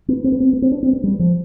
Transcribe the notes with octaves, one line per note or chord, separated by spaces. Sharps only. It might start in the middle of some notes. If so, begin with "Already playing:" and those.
B3
C4
B3
C4
B3
C4
D4
C4
B3
G3
F3